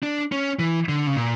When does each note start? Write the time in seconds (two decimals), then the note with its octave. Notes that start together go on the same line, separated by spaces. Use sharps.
0.03 D4
0.32 C#4
0.59 E3
0.89 D3
1.07 C#3
1.16 A#2